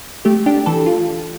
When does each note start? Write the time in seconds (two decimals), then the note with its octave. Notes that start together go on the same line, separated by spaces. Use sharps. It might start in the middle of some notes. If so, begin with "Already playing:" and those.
0.25 A3 G4
0.46 D4 G4
0.66 E3 A4
0.86 F4